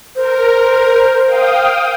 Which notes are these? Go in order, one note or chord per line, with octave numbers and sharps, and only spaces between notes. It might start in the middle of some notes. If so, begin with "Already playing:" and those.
A#4 C5
F5 G5 D#6